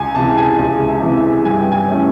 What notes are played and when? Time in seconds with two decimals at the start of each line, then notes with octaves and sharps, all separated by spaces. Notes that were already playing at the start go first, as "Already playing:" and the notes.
Already playing: C#2 G#5
0.15 C3 E3 A5
0.37 G#5
0.59 C#2
0.88 E5
1.02 C3 E3
1.17 E5
1.45 G2 G#5
1.59 G5
1.72 G#5
1.88 E3 A3 C#4